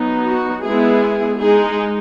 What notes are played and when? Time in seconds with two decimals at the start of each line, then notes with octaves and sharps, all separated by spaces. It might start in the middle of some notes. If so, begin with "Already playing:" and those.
Already playing: F#3 B3 D#4
0.27 F#4
0.64 G#3 B3 E4 G#4
1.40 G#3 D#4 G#4